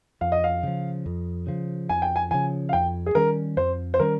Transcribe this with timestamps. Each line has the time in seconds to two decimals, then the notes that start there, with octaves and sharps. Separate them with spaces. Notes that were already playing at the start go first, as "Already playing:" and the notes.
0.21 F2 F5
0.32 D#5
0.44 F5
0.63 C#3 F3
1.06 F2
1.47 C#3 F3
1.89 F2 G#5
2.02 G5
2.16 G#5
2.31 C#3 F3 G#5
2.69 F5
2.73 F2 G5
3.06 G#4
3.15 D#3 G3 C#4 A#4
3.57 F2 C5
3.94 C5
4.00 D#3 G3 C#4 A#4